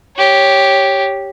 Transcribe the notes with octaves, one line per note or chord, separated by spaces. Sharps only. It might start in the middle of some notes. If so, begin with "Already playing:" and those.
G4 C#5